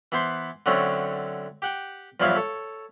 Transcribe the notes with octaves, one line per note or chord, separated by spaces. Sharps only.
E3 B3 C5 C6
D3 F#3 A3 C4 C#4
G4 F#5 G5
E2 G2 F3 F#3 E4 F5
A4 C#5